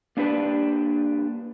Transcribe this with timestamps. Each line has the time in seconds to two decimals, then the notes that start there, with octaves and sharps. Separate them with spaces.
0.17 A#3 D4 G4 B4 D5 A5